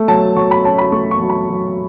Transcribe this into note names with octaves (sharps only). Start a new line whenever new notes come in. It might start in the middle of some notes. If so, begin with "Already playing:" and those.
Already playing: A3
F#3 A5
F#3 C#6
B5
C#4 A5
B5
A3 C#6
C#6
F#3
B5
F#3